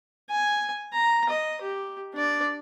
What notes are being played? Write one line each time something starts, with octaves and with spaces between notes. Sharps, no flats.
G#5
A#5
D#5
G4
D4 D5